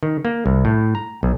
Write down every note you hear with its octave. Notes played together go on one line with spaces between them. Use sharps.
D#3
A#3
C2
A2
A#5
B1